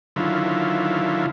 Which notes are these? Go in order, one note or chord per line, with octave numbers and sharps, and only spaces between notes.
D3 D#3 F#3 E4 F4